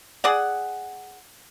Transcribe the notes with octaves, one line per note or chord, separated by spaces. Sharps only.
G#4 D5 F#5